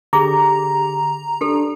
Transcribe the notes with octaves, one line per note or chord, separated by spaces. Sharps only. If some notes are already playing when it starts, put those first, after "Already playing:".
D3 G4 G#4 A#5 D6
D4 G4 A4